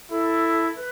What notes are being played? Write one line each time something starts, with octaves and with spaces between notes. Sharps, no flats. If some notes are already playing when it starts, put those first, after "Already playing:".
E4 A4
B4